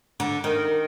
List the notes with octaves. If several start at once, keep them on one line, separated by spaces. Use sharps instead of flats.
D3
D#3